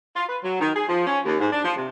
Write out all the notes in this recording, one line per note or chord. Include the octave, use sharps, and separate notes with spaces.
F4
B4
F#3
D#3
G#4
F3
C#4
D#2
G#2
D4
F3
C3